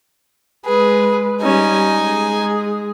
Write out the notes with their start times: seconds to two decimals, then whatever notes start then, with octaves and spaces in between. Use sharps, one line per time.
0.66 G#3 G#4 B4
1.42 G3 C#4 D#4 G#5
1.94 G#3 G#4